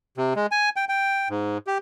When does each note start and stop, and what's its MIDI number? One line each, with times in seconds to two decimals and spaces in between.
0.17 0.34 48
0.36 0.46 56
0.52 0.69 80
0.76 0.85 79
0.89 1.28 79
1.30 1.58 44
1.67 1.78 67